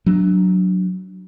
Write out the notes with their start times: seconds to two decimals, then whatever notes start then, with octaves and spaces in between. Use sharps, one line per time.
0.06 F#3 D4